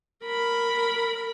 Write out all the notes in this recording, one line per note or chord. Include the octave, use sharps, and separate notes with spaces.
A#4 B5